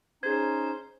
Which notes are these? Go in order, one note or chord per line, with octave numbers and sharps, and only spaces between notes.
C#4 D#4 G#4 C5 G#6